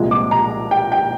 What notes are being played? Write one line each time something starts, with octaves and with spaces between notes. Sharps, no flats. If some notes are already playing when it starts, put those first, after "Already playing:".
Already playing: C2 A#2 F3 G#3
D6
A#5
G5
G5